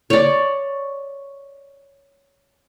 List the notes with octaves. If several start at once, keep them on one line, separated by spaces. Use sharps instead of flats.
C#5 D5